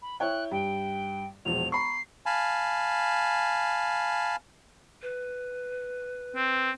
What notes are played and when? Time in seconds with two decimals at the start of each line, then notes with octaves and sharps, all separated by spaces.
0.02 B5
0.20 E4 C#5 G5 F#6
0.51 G2 G5
1.45 E1 A#1 F7
1.72 A#5 B5 C#6 C7
2.26 F5 G#5 A5 B5
5.02 B4
6.36 C4